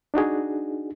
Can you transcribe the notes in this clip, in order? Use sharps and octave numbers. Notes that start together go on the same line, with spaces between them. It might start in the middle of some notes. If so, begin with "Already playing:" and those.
D4 D#4 F#4 G#4